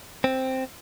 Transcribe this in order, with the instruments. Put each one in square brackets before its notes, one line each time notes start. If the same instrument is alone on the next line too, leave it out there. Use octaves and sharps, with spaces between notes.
[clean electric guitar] C4